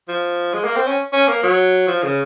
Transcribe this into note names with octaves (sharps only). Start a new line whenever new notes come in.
F3
G#3
A#3
C4
C#4
C#4
A#3
F#3
F3
C#3